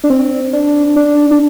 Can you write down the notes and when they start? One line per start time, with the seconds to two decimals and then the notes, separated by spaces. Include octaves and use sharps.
0.04 D4
0.10 C4
0.53 D4
0.96 D4
1.31 D4